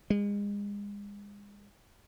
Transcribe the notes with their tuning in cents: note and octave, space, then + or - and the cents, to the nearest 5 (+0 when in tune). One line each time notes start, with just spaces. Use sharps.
G#3 -35